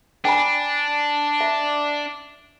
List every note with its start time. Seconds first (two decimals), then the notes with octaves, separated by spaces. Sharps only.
0.25 D4 G5 G#5 B5
1.41 E5